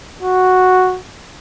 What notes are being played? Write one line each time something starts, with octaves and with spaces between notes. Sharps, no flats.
F#4